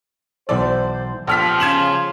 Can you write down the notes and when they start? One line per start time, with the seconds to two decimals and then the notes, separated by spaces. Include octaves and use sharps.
0.49 B1 E3 A4 C5 D5
1.27 A#1 F3 B3 G4 A4 F6 B6
1.60 C#3 G#6 E7 F#7